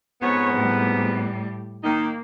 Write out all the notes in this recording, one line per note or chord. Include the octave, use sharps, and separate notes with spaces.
F2 G#2 B3 C#5
A2 G3
D#3 A#3 D#4